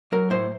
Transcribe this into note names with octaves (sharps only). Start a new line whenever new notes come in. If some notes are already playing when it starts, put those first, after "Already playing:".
F#3 A#4
A2 C5